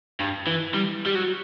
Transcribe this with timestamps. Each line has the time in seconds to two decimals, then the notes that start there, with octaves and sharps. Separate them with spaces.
0.20 G2
0.47 E3
0.74 G3
1.06 G3
1.15 F#3